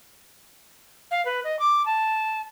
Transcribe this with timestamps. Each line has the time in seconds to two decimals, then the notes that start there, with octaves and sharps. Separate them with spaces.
1.11 F5
1.25 B4
1.44 D#5
1.59 D6
1.86 A5